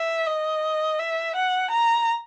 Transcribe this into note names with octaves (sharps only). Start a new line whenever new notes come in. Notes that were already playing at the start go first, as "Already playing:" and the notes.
Already playing: E5
D#5
E5
F#5
A#5